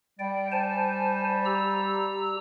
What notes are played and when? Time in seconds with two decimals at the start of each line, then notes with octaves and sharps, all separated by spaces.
0.19 G3 D5 G5
0.52 C5 G#5 A5
1.45 G4 A#5 E6